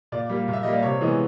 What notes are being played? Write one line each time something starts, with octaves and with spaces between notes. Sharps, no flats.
A#2 D5
G3 A#3
A#2
E5
G3 A#3 D#5
D5
C3 C#5
E3 G#3 B3